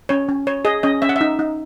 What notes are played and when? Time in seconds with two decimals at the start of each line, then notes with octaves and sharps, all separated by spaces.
0.09 C#4 C#5
0.29 C#4
0.47 C#5
0.65 G#4 D#5
0.83 C#4 D#5
1.02 C#4 E5
1.09 F#5
1.16 D#4 E5
1.39 D#4